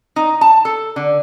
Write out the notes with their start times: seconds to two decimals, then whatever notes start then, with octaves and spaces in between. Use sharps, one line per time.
0.16 D#4
0.41 A5
0.65 A4
0.96 D3